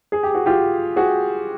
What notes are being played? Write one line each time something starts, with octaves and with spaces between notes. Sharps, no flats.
G#4
G4
F#4
F4 G4
F#4 G#4